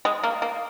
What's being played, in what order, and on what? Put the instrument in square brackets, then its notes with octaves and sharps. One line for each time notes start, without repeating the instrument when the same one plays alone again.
[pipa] G#3
A#3
A#3